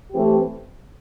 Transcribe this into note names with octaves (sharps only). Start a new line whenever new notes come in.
E3 A3 C4 G4